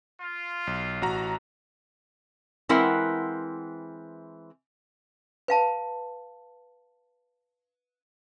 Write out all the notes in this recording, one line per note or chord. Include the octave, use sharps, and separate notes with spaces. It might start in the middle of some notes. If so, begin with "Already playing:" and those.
F4
B1
A1 F#4 A#5
E3 G#3 C4 E4 A#4 F#5
B4 F5 A5